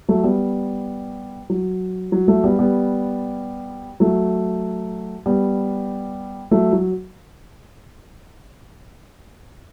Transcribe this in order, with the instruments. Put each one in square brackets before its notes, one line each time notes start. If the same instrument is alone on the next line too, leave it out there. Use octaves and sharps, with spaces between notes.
[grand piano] F#3 A3
G3 B3
F#3
F#3
F#3 A3
G3 B3
G3 B3
F#3 A3
G3 B3
F#3 A3
F#3